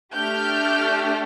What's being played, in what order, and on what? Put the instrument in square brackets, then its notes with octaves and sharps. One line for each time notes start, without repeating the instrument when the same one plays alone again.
[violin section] A3 D4 G4 F6 G6